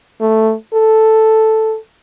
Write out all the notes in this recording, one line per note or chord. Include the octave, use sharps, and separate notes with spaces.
A3
A4